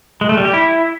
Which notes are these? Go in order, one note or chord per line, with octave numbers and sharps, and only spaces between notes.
G#3
A3
G3
G4
E4